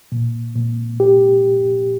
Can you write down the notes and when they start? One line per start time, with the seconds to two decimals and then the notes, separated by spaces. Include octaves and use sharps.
0.12 A#2
0.56 A#2
1.00 G4